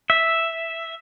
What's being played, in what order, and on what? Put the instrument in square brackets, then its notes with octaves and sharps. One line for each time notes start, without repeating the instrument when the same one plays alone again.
[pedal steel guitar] E5